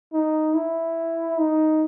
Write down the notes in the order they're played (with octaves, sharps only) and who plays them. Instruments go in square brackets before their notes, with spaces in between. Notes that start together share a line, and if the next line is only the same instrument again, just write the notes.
[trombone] D#4
E4
D#4